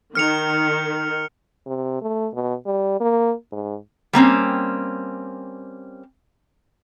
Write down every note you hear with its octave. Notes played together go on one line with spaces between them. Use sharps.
D#3 F6 C#7 F7
C3
A3
B2
G3
A#3
G#2
G3 A#3 C4 C#4